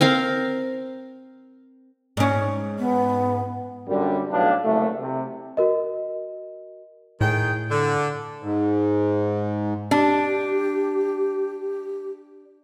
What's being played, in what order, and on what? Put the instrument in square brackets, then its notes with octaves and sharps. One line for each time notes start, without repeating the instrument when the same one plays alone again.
[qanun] C4 A#4 F5
[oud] G#2 C#4
[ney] B3
[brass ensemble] F#2 A#2 D3 G3
B1 A2 D4 F5
F#1 C2 A3
C3
[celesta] F#4 A#4 D#5
[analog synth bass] A2 [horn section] D#3 G#4 G5
[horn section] D3
[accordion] G#2
[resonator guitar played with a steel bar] D4 [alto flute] G4